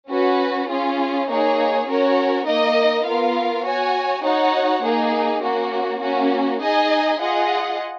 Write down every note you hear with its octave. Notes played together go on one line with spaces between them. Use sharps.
C#4 F#4 B4
C#4 F4 G#4
A#3 D#4 G#4 C#5
C#4 F#4 A#4 C#5
A#3 D#4 A#4 D#5
B3 F4 A#4 F5
F#4 C#5 G#5
D#4 F#4 C#5 F#5
A#3 D#4 G#4
A#3 C#4 F#4
A#3 C#4 F#4
D#4 G#4 D#5 G#5
F4 G#4 D#5 F#5